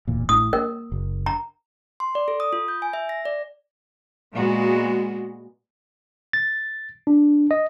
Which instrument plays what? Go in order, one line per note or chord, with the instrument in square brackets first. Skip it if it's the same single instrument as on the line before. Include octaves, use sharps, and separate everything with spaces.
[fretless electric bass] D1 E2 A#2
[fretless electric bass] A1 A2 [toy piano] D#6
[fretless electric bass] A#3 [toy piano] A#4
[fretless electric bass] F#1
[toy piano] A#5
[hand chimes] C6
D5
A4
D#6
F4
G6
G#5
E5
A#6
D5
[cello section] A#2 G#3 B3 F#4
[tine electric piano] A6
D4
D#5